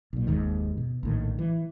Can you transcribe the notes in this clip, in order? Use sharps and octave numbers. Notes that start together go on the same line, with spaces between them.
B1 A#2
F#1 D#2 G#2 D#3
B2
A#1 A2 D#3
E3